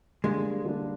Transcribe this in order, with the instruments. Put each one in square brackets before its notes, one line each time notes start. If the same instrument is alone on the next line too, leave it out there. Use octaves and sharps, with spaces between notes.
[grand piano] D3 G3 A#3 D4 [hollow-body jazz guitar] G#3
[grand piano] D3 G3 A#3 D4